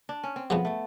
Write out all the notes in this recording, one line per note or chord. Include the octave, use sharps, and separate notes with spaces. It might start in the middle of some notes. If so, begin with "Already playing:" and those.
D4
C#4
C4
F2 C#3 F#3 B3
A3